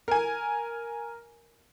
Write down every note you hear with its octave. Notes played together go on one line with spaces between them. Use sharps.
A#4 G#5